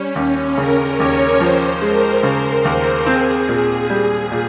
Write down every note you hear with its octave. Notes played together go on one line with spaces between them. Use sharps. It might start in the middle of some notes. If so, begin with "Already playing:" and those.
Already playing: G3 C#4
D#2
C#3 A#4
D#2 C#5
F3 C5
G#3 A#4
C#3
D#2
C4 G#4
A#2
G3
A#2